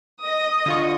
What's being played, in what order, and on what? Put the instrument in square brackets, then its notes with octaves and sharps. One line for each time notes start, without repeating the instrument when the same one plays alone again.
[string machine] D#5 [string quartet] D#6
[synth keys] D3 F4 C#6